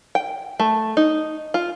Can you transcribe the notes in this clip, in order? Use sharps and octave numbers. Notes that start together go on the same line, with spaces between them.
G5
A3
D#4
F4